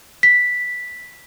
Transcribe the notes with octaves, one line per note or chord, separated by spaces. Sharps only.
B6